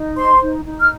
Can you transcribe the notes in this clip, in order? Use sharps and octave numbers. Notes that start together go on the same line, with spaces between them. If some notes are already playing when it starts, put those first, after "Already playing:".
Already playing: D#4
C5 C6
D#4
D#4
F6